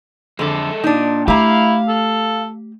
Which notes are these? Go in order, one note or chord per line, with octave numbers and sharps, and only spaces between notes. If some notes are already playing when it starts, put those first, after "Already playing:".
F2 D3 G#3 A4
A#2 D4 D#4
A3 E4 G4 F5 A#5
A4